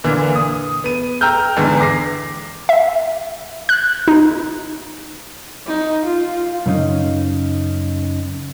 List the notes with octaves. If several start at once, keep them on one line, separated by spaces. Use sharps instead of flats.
A#2 D3 E3
D#6
B3 D#7
G5 A#5 E6 F6 G6
E2 G#2 D3 E3
D6 A#6 C7
E5
F#6
D#4
D#4
F4
F#2 C#3 C#4 D#4 F5